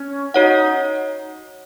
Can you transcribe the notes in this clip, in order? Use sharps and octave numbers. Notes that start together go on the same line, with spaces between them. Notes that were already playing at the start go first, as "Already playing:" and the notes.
Already playing: C#4
D#4 F#4 C#5 F#5